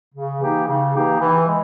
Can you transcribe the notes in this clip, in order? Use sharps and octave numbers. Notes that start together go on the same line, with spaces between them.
C#3
E3 A#3 D#4 G4
C#3
E3 A#3 D#4 G4
E3
G#3